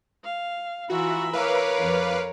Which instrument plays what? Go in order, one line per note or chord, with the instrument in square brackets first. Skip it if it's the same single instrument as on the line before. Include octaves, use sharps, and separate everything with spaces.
[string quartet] F5
[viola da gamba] E3 F4 [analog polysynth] F#4 [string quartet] E5 A#5 B5
[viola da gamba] A#4 C#5 [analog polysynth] B4 F5 D6
[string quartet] F2